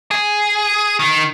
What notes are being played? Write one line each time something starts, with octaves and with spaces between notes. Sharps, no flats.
G#4
D#3